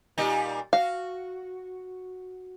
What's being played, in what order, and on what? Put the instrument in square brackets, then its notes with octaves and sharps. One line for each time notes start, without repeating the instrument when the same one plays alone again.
[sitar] A#2 G3 D#4
[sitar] F#4 [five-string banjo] F5